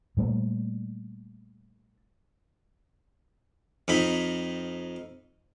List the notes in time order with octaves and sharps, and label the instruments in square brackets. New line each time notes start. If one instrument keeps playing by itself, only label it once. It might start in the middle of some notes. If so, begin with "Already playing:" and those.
[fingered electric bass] A#2 G3 A3
[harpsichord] F2 D#4 B5